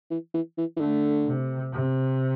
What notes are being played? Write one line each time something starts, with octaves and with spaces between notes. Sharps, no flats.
E3
E3
E3
E3
D3 A3
C3
C3